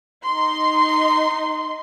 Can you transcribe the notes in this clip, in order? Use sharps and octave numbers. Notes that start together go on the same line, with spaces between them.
D#4 C6